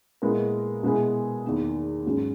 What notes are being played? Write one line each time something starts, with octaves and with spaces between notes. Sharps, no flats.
A#2 G#3 B3 E4 A#4
B2 G#3 B3 E4 G#4
E2 D#3 A#3
G#2 F#3 C#4